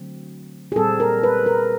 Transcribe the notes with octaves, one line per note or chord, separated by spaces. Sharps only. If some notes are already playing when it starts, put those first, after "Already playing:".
Already playing: D3 F#3 A3 C4
G#4
A#2 G3 C4 A4
A#4
B4
A#4